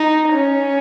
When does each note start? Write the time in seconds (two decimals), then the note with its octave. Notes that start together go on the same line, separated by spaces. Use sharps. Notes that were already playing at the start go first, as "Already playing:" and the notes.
Already playing: D#4
0.32 C#4